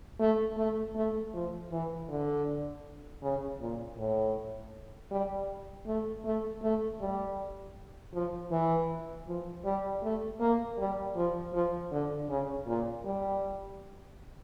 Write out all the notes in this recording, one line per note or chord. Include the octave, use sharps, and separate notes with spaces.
A3
A3
A3
F3
E3
D3
C#3
A#2
A2
G3
A3
A3
A3
G3
F3
E3
F3
G3
A3
A#3
G3
F3
F3
D3
C#3
A#2
G3